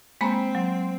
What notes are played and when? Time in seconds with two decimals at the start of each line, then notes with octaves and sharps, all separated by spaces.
0.21 G#3 A#3 C4 B5
0.55 F#3